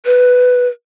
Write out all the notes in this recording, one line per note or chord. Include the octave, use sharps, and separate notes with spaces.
B4